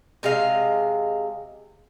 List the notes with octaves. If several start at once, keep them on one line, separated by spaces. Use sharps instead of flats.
C3 G#3 D#5 F5